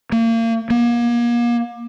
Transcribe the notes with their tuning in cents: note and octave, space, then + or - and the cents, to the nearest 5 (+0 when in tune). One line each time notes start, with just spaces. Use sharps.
A#3 -35
A#3 +35